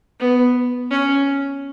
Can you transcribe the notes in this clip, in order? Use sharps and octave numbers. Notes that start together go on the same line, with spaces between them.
B3
C#4